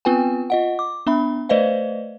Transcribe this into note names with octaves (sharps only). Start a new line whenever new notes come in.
B3 C4 F4 B4 G5 G#5
F4 D#5 F#5
D6
B3 D4 E5 B5
A3 B4 C5 D5 D#5 F5